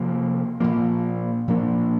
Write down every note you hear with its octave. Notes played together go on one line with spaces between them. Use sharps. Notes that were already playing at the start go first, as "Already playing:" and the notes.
Already playing: C3 F3 A#3
A#2 F3 A#3
A#2 F3 A#3 D4